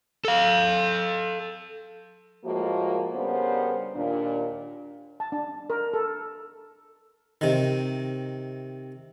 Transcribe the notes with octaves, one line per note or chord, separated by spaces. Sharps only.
A4 F5
A2 F3 G#3 A#3 F#4
C#3 G3 B3 D4 A#4 C5
D#2 A#2 D4
A5
D4
A#4
A4
C3 D#3